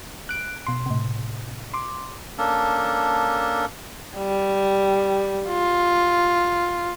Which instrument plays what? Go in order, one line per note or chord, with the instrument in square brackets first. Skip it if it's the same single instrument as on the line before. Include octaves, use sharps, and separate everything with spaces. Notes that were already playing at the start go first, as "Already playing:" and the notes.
[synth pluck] F#6 D7
B2 C6
A2 C3
C6 D6
[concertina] A#3 C#4 D4 A4
[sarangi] G3
F4